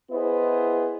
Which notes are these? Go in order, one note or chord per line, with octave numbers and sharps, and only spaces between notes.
B3 E4 G#4 C5 D#5